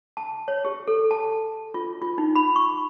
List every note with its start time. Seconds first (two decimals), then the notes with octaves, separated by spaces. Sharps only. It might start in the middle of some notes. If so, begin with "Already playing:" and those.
0.17 A5
0.48 C#5
0.65 G4
0.87 A4
1.11 A5
1.74 F4
2.02 F4
2.18 D#4
2.35 B5
2.56 C#6